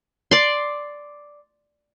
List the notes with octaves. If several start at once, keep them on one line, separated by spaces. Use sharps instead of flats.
D5 C6